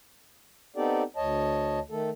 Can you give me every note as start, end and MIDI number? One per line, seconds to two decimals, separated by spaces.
0.76 1.03 59
0.76 1.03 60
0.76 1.03 63
0.76 1.03 67
0.76 1.03 69
0.76 1.03 74
1.16 1.79 38
1.16 1.79 73
1.16 1.79 75
1.16 1.79 81
1.90 2.10 51
1.90 2.10 57
1.90 2.10 69